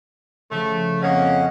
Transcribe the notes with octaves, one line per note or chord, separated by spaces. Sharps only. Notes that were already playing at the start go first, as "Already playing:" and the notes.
C#3 F3 A3
F2 A#3 C#4 D#5 F#5